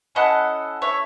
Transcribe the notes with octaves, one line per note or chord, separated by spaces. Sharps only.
C#4 E4 A4 D#5 F#5
C#5 E5